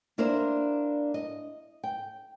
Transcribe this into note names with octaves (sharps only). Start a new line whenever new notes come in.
A#3 D4 E4 A#4 C5 D5
D#5
G5